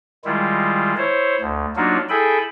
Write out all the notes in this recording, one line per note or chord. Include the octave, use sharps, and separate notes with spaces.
D#3 G3 G#3 E4 F4
E4 C5 C#5
D2
F#3 A#3 D4 D#4 F4 F#4
E4 G#4 A4 G5 G#5 B5